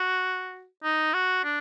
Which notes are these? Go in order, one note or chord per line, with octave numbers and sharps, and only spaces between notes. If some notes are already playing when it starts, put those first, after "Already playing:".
Already playing: F#4
D#4
F#4
D4